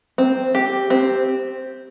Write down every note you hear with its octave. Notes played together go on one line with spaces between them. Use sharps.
C4
G4
C4